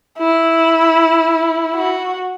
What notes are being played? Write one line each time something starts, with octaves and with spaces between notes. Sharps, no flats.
E4
F#4